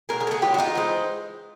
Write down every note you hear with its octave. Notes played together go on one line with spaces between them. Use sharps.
B2 F#3 A3 G#4 A#4
G#4 A#4
A4
F#4 G#4
E3 G#3 C#4 F4 G4
F#4
D#4 F4
E3 G#3 C4